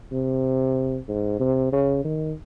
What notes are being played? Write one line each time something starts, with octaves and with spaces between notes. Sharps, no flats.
C3
G#2
C3
C#3
D#3